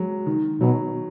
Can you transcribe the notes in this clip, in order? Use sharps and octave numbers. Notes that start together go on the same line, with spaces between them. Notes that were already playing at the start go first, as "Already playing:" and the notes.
Already playing: F#3 G#3
D#3
B2 F#3